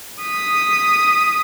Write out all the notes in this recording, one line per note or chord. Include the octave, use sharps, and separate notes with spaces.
D#6 B6